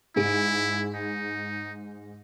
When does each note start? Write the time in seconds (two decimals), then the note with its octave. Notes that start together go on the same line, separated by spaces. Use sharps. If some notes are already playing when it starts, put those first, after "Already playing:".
0.16 G#2 E4 G#4 D7
0.95 D#4